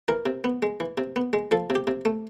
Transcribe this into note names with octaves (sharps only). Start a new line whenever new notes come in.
E3 A#4
C3
B3
G#3
E3
C3
B3
G#3
F3 A4
C3
G4
C3
A3